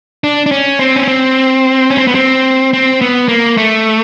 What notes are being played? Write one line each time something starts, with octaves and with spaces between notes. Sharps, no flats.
D4
D4
C#4
C4
C#4
C4
C#4
C4
B3
C4
C4
B3
A#3
A3